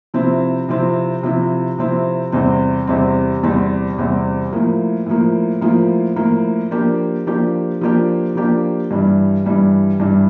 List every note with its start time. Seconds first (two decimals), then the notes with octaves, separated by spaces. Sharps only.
0.14 C3 F3 C4 E4
0.69 C3 F3 C4 E4
1.23 C3 F3 C4 E4
1.79 C3 F3 C4 E4
2.32 E2 C3 G3 C4
2.87 E2 C3 G3 C4
3.43 E2 C3 G3 C4
3.98 E2 C3 G3 C4
4.53 A2 F3 A#3
5.06 A2 F3 A#3
5.61 A2 F3 A#3
6.16 A2 F3 A#3
6.71 F3 A#3 D4 G4
7.27 F3 A#3 D4 G4
7.81 F3 A#3 D4 G4
8.35 F3 A#3 D4 G4
8.91 G2 E3 G3
9.46 G2 E3 G3
10.00 G2 E3 G3